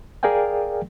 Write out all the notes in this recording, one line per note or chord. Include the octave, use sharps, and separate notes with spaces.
G#4 A#4 D5 F5 G5 G#5